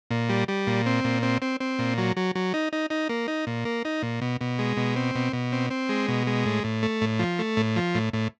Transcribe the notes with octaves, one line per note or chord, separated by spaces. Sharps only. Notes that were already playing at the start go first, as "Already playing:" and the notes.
A#2
G3
G3
A#2
C4
A#2
C4
C4
C4
A#2
F#3
F#3
F#3
D#4
D#4
D#4
A#3
D#4
A#2
A#3
D#4
A#2
B2
B2
G#3
B2
C4
B2
B2
C4
C4
G#3
B2
G#3
A2
A2
A3
A2
F3
A3
A2
F3
A2
A2